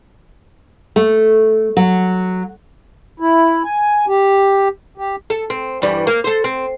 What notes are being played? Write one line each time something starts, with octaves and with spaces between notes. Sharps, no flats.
A3
F#3
E4
G#5
G4
G4
A4
C4
G2 E3 G3
A#3
A4 C5
C4